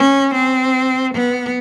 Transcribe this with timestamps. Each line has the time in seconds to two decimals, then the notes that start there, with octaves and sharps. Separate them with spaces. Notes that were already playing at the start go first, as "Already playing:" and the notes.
Already playing: C#4
0.34 C4
1.14 B3